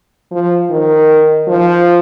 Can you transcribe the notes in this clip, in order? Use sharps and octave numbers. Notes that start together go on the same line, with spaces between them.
F3
D#3
F3